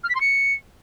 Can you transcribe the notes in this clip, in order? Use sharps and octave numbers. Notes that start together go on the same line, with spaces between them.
F6
B6
C6
C#7